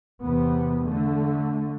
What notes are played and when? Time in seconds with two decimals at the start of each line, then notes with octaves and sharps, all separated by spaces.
0.24 E2 C3 B3
0.86 D3 A3